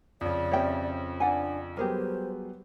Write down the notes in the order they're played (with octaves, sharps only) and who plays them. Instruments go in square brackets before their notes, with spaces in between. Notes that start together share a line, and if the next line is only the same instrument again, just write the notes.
[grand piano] F2 C#3 [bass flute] D5
[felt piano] C4 C#4 G4 [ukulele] C#5 E5 G5
[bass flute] D4 [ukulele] D5 F#5 G#5
[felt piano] F#3 G3 B3 [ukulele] G4 G#4 A#4 [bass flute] C5